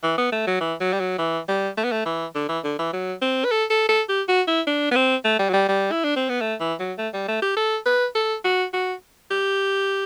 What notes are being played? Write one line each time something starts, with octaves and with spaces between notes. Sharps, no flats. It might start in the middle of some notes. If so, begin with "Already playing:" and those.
E3
B3
A3
F#3
E3
F#3
G3
F#3
E3
G3
A3
B3
A3
E3
D3
E3
D3
E3
F#3
C4
B4
A4
A4
A4
G4
F#4
E4
D4
B3
C4
A3
G3
F#3
G3
G3
E4
D4
C4
B3
A3
E3
F#3
A3
G3
A3
G4
A4
B4
A4
F#4
F#4
G4